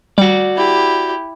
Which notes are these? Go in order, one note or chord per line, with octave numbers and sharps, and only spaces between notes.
G3 F#4 D5
E4 G4